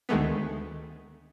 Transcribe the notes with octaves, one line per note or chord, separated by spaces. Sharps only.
D2 D#3 G#3 A3 B3